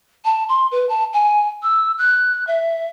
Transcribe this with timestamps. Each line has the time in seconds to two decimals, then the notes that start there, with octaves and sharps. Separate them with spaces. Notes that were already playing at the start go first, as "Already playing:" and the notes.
0.24 A5
0.48 C6
0.71 B4
0.89 A5
1.13 G#5
1.62 E6
1.98 F#6
2.47 E5